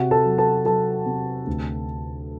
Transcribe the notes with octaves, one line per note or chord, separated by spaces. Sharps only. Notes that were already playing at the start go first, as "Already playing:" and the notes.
Already playing: C3 F#4 F#5
A4 A5
F#3
A4 A5
F#3 A4 A5
C3
D2